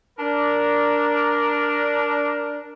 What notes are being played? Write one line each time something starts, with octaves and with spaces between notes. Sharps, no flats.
D4 A#4